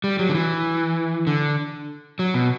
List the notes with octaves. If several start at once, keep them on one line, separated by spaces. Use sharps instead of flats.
G3
F#3
D3
E3
D3
F#3
B2